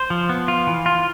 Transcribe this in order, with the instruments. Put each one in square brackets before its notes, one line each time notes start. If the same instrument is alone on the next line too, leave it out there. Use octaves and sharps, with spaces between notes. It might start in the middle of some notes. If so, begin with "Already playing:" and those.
Already playing: [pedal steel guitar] C5
F3
B3
F4
E3
F4